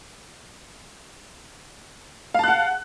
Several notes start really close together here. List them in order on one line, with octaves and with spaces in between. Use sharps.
F5 A5 F#6 F#5